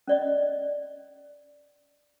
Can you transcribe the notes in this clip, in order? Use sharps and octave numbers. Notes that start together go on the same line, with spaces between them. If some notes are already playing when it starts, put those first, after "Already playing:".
C#4 D5 D#5